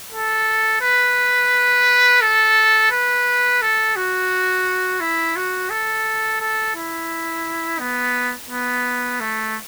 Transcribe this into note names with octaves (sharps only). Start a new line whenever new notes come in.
A4
B4
A4
B4
A4
F#4
E4
F#4
A4
A4
E4
B3
B3
A3